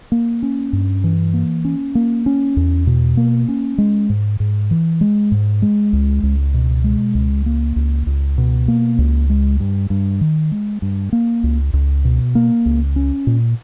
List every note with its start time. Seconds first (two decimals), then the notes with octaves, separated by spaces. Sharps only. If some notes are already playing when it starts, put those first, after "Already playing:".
0.12 A#3
0.42 C#4
0.73 G2
1.04 E3
1.34 A#3
1.65 C#4
1.95 A#3
2.26 C#4
2.57 E2
2.87 B2
3.17 A#3
3.48 C#4
3.78 G#3
4.09 G#2
4.40 G#2
4.71 E3
5.01 G#3
5.32 G#2
5.62 G#3
5.93 C#2
6.23 C#2
6.54 B2
6.84 G#3
7.15 C#2
7.46 A#3
7.76 C#2
8.07 C#2
8.38 B2
8.68 A#3
8.98 C#2
9.30 G#3
9.60 G2
9.90 G2
10.21 D#3
10.52 G#3
10.82 G2
11.13 A#3
11.44 C#2
11.73 C#2
12.05 B2
12.35 A#3
12.66 C#2
12.96 C#4
13.27 A#2